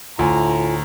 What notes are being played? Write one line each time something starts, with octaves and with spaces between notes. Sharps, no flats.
D2 A2 F4 G#5 A#5